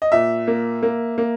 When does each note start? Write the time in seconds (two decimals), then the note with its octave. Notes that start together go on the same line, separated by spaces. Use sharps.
0.02 D#5
0.12 A#2 E5
0.48 A#3
0.83 A#3
1.18 A#3